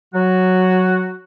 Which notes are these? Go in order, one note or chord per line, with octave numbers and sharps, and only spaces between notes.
F#3 F#4